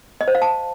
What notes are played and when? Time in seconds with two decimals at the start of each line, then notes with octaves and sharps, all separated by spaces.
0.21 D#5
0.28 C5
0.35 F5
0.42 A5